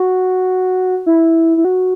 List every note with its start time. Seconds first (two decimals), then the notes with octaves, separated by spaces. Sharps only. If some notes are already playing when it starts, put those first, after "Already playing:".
Already playing: F#4
1.06 E4
1.57 E4
1.65 F#4